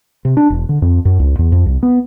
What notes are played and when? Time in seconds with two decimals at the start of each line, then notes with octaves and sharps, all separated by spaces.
0.25 C3
0.37 D4
0.50 E1
0.69 D3
0.82 F2
1.05 F#2
1.19 C#2
1.39 E2
1.52 F2
1.66 C2
1.83 B3